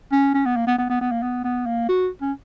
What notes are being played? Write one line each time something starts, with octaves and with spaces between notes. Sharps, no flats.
C#4
C#4
B3
A#3
B3
B3
B3
B3
A#3
B3
B3
A#3
F#4
C#4